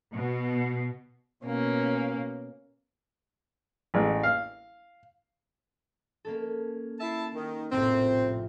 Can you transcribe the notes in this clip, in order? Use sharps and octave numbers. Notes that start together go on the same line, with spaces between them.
B2
B2 A#3 C#4
A1 G#3
F5
A#3 C#4 A4
E4 E5 A5 C7 D#7
D#3
F1 A#1 A2 C4